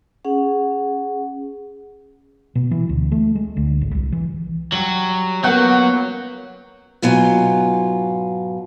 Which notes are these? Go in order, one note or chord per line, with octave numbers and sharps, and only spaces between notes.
C#4 G#4 F#5
B2
E3
D2
A3
G#3
D2
G#1
C2
E3
F#3 G3 F#7
F#3 A#3 B3 C#4 F#5 F#6 G6
G#2 B2 F#3 F4 G#5